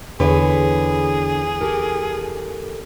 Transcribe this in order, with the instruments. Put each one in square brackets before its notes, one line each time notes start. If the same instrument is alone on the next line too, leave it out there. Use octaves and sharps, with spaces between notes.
[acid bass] E2 [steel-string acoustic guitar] D3 B4 C#5 [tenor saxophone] G#4
[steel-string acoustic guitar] G4 A4 A#4